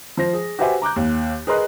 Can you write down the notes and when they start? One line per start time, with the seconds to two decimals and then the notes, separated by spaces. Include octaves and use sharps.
0.17 F3 C5 A#6
0.33 G#4
0.59 F#4 G4 B4 C5 E5 G#5
0.82 A#5 D6 F#6 G6
0.96 D#2
1.47 G#4 A#4 B4 D#5 C6 F#6